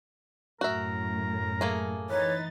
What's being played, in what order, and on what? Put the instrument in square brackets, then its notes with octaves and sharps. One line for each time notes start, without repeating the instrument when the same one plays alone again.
[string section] F#2 A2 [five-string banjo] F#4 E5 [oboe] A#4
[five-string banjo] A3 A#3 G#4
[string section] E3 D#4 A6 [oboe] B4 [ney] C#5